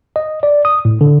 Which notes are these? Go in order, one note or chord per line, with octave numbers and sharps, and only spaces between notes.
D#5
D5
D#6
A2
D3